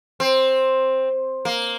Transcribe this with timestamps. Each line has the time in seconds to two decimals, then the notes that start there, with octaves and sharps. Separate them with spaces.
0.20 C4
1.45 A#3